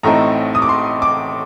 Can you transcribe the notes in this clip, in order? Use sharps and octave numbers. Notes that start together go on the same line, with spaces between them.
A1 A2 A3 C4 D#4 A#5
D#6
D6
C6
D6